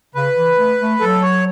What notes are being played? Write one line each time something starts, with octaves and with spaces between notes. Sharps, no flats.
C#3 B4
E3
A3
A3
F#3 A4
C#5